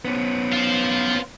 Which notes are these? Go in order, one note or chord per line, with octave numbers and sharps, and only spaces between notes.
B3 C#4
F4 C5